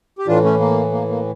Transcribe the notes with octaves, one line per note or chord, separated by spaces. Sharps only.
G4
A2 E3 D4 F4
A3 C#4
A#3
A#3
A#3